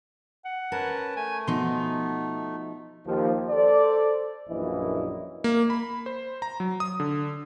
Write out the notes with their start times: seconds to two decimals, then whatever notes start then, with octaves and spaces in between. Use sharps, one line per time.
0.45 F#5
0.72 C#4 A#4 B4 A5
1.16 A3 G#5
1.47 B2 F3 B3 D#4 F#4 C6
3.06 D#2 F3
3.50 A4 C5 D5
4.49 A#1 F#2 A#2 E3 E4 D#5
5.44 A#3
5.70 B5
6.06 C5
6.42 A#5
6.60 F#3
6.80 D#6
7.00 D3